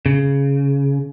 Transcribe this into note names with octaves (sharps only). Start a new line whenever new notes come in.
C#3